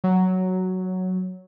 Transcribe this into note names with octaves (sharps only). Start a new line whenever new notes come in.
F#3